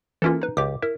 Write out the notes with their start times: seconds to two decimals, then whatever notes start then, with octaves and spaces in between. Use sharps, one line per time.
0.22 E3 A#3 C#4 E4 F4 A4
0.42 D#4 B4
0.57 C#2 G4 D6
0.82 E4 A#4